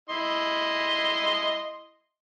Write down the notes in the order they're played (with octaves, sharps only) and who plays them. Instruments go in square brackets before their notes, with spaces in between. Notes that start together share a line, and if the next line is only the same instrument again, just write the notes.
[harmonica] E4 D#5 C6